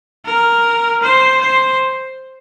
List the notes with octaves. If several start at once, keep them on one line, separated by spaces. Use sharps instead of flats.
A#4
C5
C5